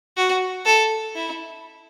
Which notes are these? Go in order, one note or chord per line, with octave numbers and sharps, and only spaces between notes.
F#4
A4
E4